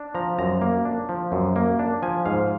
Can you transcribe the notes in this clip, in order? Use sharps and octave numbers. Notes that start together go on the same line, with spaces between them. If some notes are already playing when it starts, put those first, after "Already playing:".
Already playing: D4
F3 A#5
F#2 A#5
A#3
D4
F3
F#2
A#3
D4
F3 G#5
G#2 F5